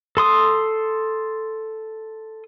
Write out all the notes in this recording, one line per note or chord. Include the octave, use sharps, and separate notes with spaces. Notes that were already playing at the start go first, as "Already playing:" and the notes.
A4 C6 D#6